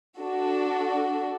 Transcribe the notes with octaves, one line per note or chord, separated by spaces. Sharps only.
D4 F#4 A4